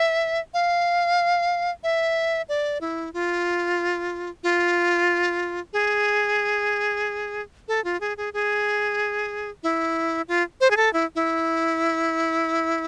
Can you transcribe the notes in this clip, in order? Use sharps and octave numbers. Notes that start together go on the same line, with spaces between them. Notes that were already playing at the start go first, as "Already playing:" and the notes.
Already playing: E5
F5
E5
D5
E4
F4
F4
G#4
A4
F4
G#4
G#4
G#4
E4
F4
C5
G#4
A4
E4
E4